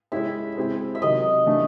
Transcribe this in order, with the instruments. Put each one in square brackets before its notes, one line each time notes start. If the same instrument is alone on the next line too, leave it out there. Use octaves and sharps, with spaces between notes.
[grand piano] G#3 C#4 E4 G4 [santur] E5
[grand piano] G#3 C4 E4 G4
[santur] E5
[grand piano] C3 D#3 F#3 [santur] D#5
[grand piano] E3 A3 D4